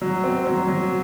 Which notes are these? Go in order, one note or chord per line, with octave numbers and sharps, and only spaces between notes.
F#3
C4
F#3
F#3